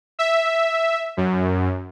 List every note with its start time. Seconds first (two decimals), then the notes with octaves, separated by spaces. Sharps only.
0.19 E5
1.17 F#2